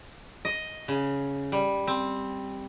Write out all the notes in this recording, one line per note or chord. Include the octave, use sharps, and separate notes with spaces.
D#5
C#3
G3
C4